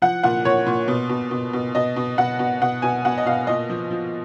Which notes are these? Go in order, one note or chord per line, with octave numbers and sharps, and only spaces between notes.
F3 F#5
A#2 F#5
A#2 C#5
A#2
B2
B2
B2
B2
B2 D#5
B2
B2 F#5
B2
B2 F#5
B2 G#5
B2 F#5
D#5
B2 F5
A#2 D#5
F3
F3